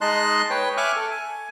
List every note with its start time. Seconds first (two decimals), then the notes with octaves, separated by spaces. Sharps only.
0.01 G#3 D#4 D#5 A5 C6 F#6
0.50 B4 C#5 G5
0.77 E5 G#5 C#6 D6 F6 F#6
0.96 A4
1.11 G#5